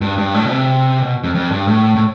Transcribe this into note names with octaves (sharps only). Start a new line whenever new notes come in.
G2
G2
A2
B2
C3
B2
F2
F2
G2
A2
A2